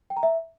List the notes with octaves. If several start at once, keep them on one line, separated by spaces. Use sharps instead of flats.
G5
A#5
E5